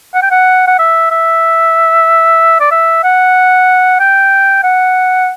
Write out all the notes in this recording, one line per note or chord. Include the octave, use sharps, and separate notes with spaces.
F#5
G5
F#5
F#5
E5
E5
D5
E5
F#5
G5
F#5